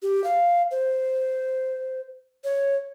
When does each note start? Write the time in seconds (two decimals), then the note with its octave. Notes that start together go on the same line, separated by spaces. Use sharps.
0.03 G4
0.24 F5
0.71 C5
2.44 C#5